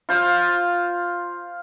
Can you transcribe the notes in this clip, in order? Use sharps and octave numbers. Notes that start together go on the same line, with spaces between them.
F4 C5 F5